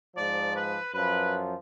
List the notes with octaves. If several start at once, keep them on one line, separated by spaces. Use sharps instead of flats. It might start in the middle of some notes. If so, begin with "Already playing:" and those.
G#2 F3 D5
B4
F#2 F3 B4